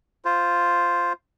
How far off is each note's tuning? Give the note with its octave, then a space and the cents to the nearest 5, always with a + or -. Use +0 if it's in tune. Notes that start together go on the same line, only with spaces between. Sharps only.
F4 +0 C5 +0